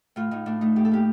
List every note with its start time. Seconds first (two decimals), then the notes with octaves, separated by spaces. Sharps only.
0.16 A2 F4
0.31 A2 D#4
0.46 A2 D4
0.61 A3 D#4
0.76 A2 G4
0.85 A4
0.92 A#3 G4